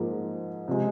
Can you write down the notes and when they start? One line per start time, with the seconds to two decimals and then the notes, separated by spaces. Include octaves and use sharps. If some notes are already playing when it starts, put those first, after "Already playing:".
Already playing: G#2 F3 A#3
0.68 C3 F3 G#3